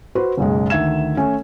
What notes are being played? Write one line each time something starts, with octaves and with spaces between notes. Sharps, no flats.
F#4 B4 C5
F#1 B1 G#3
D2 D#3 E5 G#6 E7
A3 C#4 G#5